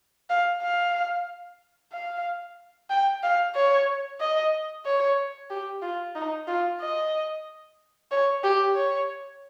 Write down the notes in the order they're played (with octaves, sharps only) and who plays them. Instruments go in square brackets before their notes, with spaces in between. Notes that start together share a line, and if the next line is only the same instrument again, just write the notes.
[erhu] F5
F5
F5
G5
F5
C#5
D#5
C#5
G4
F4
D#4
F4
D#5
C#5
G4
C#5